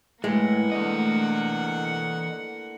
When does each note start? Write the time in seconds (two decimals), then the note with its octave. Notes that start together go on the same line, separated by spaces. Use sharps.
0.24 A2 E3 G#3 A#3 E4 F#5
0.72 D3 E3 A3 D#5